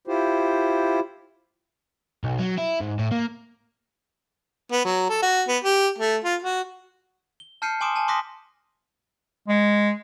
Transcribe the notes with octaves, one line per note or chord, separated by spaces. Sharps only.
E4 F4 G4 C5
B1
F#3
E4
G#2
A2
A#3
B3
F#3
A4
F#4
B3
G4
A3
F4
F#4
G7
A5 F6 G6 C7 C#7 D#7
G#5 C6 D6 D#6 D7 E7
G#5 A5 D#7
C6 D6 D#6 F#6 A#6 B6
G#3